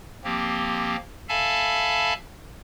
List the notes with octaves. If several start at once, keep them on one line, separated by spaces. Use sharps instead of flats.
F3 A#3 C4 G4
A4 E5 F5 G#5 A5 B5